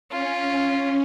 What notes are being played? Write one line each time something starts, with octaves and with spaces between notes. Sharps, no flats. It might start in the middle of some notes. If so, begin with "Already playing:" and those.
C#4 F4